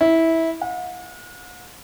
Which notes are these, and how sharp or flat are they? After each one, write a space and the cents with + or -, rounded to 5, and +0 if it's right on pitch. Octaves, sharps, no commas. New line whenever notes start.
E4 -15
F#5 -45